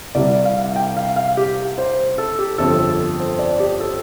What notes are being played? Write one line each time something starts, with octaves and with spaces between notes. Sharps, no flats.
C2 C3 G3 D5
F5
G5
F5
F5
G4
C5
A4
G4
G1 F2 F3 A4
A4
C5
D5
G4
A4